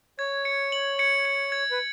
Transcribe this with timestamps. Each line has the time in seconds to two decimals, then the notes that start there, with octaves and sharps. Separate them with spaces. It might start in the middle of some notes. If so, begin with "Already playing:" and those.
0.19 C#5 G#6
0.45 C#7
0.72 F#7
0.99 C#7
1.25 C#7
1.52 G#6
1.71 B4